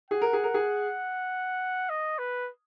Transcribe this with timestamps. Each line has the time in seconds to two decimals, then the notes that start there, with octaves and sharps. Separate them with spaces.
0.11 G#4 F#5
0.21 A#4
0.33 G#4
0.44 A#4
0.54 G#4
1.89 D#5
2.19 B4